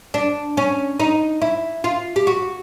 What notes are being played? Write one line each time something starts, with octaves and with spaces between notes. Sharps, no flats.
D4
C#4
D#4
E4
F4
G4
F#4